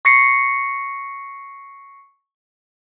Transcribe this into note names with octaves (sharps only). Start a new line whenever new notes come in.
C#6 A#6 C7 C#7